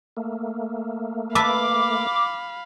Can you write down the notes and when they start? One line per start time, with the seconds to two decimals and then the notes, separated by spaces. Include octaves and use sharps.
0.17 A3 A#3
1.35 B4 E5 F5 A5 B5 D6